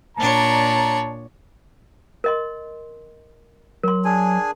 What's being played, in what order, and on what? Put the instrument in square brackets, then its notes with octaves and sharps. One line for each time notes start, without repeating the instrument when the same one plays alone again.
[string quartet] A#2 D4 C#5 [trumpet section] A5 A#5
[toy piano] A#4 D#5 C6
[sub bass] F#3 [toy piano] A#4 C6
[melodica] D4 G#4 G#5